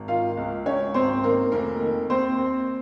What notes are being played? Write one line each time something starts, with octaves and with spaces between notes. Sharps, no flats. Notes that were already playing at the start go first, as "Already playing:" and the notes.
Already playing: G#1
D#3 F4 F5
C#2
C#2 C#4 C#5
G#1 C4 C5
D#3 A#3 A#4
F1 A#3 A#4
D#3
D#2 C4 C5
D#2